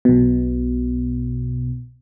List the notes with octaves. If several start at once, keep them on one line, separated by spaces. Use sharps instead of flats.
B1 B2